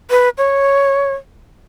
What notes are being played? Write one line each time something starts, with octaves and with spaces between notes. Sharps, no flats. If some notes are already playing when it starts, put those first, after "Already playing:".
B4
C#5